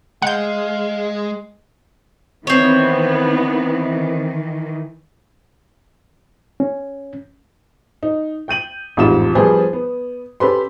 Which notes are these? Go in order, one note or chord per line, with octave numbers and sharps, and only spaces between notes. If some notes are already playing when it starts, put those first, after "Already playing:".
G#3 D#5 F5 F#5 G6
D#3 E3 B3 C4 C#5
C#4
D#4
G5 G6 D#7 F#7
A1 F2 G#2 F4 G4 E7
F3 G3 B3 G#4 C5
B3
C#4 G4 A4 B4 B5 C6